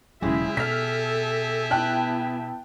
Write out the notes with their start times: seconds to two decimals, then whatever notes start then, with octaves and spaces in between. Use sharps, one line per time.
0.22 E1 C#3 F#3 G#3 E4 G4 G#4 E5
0.57 B2 A4 F6 B6
1.71 B3 E4 G5 A5 F#6